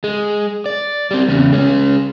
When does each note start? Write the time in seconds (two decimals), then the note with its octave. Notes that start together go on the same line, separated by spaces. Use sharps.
0.04 G#3
0.66 D5
1.11 G3 C4
1.28 E2 C#3
1.52 G#3 C#4